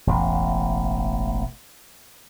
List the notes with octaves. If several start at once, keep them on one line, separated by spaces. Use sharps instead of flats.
E1 A1